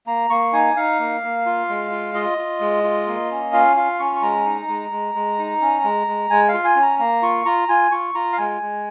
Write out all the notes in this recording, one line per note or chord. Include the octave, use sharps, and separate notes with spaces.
A#3 A#5
A#3 C#6
D#4 G#5
D#4 F5
A#3
A#3
F4
G#3
F4
F4 D#5
F4
G#3
F4
A#3
C#4
F4 F5
F4 F5
C#4 C#6
C#6
G#3 A#5
D#4
G#3
G#3
G#3
D#4
C#4
G#3
G#3
G#3 G#5
F5
F4
G#5
C#4
A#5
A#3 A#5
F4 C#6
F4 A#5
F4 G#5
F4 C#6
F4 A#5
F5
G#3 G#5
G#3